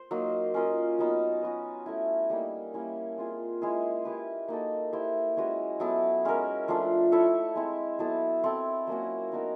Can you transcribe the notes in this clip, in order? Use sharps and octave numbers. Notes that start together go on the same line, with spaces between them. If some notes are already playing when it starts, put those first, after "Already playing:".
Already playing: C5
F#3 A#3 D#4
C#4 F4 A#4 D#5
F#3 B3 D#4 F#4
C#4 F#4 B4
A3 C#4 E4
G3 A#3 D#4
G3 A#3 C#4 E4
C4 F4 G#4
G#3 C#4 E4 G#4
E4 G4 B4
A#3 D#4 F#4 A4
E4 G4 C5
G#3 C#4 F#4 B4
F#3 B3 E4 A4
G#3 C#4 F#4 A#4
F3 A3 D4 F4
E4 A4 C#5 E5
G#3 C4 E4
F#3 B3 E4 A4
C4 E4 A4
F#3 A#3 C#4 F#4
B3 D#4 F#4 A#4